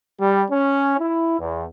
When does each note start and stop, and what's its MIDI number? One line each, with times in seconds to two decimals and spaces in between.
0.20 0.43 55
0.51 0.98 61
0.99 1.38 64
1.39 1.65 40